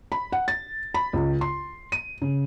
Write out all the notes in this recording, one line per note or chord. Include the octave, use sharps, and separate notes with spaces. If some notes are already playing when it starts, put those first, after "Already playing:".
B5
F#5
A6
B5
C#2
C6
D#7
C#3